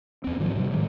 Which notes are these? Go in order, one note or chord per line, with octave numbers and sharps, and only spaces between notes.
E2 C4
G#2 D#3 F3 F#3
C3 F#3 G3
A2 D#3 F#3 G#3